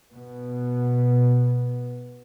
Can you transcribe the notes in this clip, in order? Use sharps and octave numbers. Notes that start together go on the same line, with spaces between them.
B2 B3